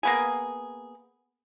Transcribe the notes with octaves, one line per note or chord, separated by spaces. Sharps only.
A#3 B3 G#4